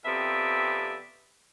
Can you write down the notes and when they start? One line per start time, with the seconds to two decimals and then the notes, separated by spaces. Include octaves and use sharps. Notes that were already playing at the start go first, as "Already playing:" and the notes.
0.05 F2 C3 B3 D5 E5